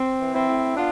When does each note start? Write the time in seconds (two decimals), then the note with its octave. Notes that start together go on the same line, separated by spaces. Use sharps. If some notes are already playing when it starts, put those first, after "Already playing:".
Already playing: C4
0.20 E3
0.34 C4 E4
0.48 A2
0.77 B3 D4 F4